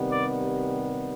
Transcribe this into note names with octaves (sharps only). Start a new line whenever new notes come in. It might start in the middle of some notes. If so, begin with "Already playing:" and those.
Already playing: C3 D#3 G3 B3
D5